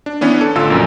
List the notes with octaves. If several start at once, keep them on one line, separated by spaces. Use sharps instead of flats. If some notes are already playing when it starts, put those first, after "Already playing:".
D4
E3 B3 C#4 D4
A4
A1 D3 F4 E6
A#1 F#2 A#2